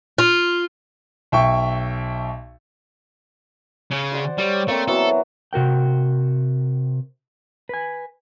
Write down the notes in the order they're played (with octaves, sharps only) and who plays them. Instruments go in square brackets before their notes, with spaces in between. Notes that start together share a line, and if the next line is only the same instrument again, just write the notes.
[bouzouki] F4
[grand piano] B1 E5 G5 C#6
[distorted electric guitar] C#3 C#4
[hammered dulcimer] C5 D5 F#5
[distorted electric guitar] G3 [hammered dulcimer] C#5
[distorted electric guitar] A3 [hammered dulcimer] A#3 C4
[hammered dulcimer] E3 F#3 B3 [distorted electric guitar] A4
[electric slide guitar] C3 F#4 A#4 G5
B4 G#5